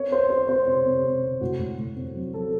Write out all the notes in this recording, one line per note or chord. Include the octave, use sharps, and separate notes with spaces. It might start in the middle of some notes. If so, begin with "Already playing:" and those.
Already playing: C4 C#5
C4 C5
C4 C5
C4 C5
C3
C4
C3
C3
A2 F#4
A2
A2
C4
F#3
F#3 A4